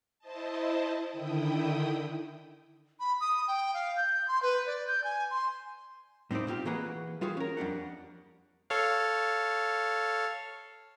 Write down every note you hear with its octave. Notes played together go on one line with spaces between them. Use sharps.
E4 C5 D#5 A5
D3 D#3 E4 G5 D#6
B5
D#6
G5
F5
G6
C6
B4
D5
G6
G#5
C6
A2 C4 D#4 C5 D5
B2 C4 F4 G4
E3 A#3 F#4 G#4 B4 F#5
G3 F4 F#4 G#4
C#4 A#4
F2 G3 D4 F#5
A4 C#5 F5